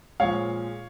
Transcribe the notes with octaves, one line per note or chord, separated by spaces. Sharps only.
A#2 F3 G#3 C#5 F5